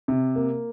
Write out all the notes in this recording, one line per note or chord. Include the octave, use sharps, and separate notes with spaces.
C3
A#3